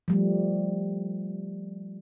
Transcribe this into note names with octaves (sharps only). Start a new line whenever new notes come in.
F3 G3 A3